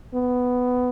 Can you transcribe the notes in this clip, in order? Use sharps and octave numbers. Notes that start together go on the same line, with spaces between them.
B3